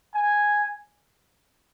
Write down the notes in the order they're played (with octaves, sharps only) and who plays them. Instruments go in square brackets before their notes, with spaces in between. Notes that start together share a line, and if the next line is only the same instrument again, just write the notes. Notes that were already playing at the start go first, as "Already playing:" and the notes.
[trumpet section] G#5